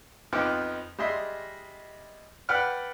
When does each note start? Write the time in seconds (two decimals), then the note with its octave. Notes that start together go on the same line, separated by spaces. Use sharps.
0.33 F2 F3 B3 D#4 G5 D6
0.98 G3 G#3 D#5 E5 C6
2.49 B4 D5 F#5 G5 B5 F6